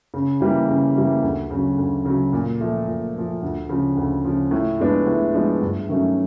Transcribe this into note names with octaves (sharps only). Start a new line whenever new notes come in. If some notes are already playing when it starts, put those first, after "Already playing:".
C#3
E3 G3 A#3
C#3
E3 G3 A#3
D2
C#3 F#3
D2
C#3 F#3
A#2
F3 A3
A#2
F3 A3
D2
C#3 F3
D2
C#3 F3
A2
F3 G#3 B3 D4
A2
F3 G#3 B3 D4
G2
D#3 F#3 A3 C#4